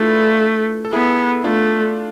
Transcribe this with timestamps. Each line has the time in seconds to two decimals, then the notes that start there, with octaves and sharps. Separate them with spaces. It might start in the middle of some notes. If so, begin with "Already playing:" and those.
Already playing: A3 D4 E4 F4 G#4 A4 B4
0.85 A4
0.93 B3 E4 G#4
1.44 A3 D4 F4